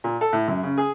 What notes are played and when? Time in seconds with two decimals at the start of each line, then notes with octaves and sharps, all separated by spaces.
0.04 A#2
0.21 A4
0.33 A2
0.48 F#2
0.63 C#3
0.78 G#4